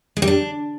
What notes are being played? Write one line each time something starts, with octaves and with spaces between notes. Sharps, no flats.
G#3
G3
D4